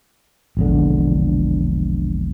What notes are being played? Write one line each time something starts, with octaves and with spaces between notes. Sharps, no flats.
E1 A#1 D3